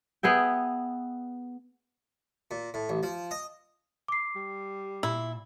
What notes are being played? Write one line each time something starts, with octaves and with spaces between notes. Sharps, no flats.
B3 G#4 E5 G5
A#2
A2
A1
F3
D#5
D6 C7
G3
A#2 E4